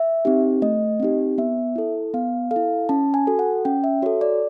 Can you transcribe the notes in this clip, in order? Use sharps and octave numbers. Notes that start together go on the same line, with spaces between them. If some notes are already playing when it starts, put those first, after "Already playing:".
Already playing: E5
C4 D#4 G4
A3 D#5
C4 D#4 G4
B3 E5
E4 A4
B3 F5
A4 F5
E4
C#4 A5
G#5
F#4 A4
F#5
C#4 G5
E5
F#4 A4 C#5
D5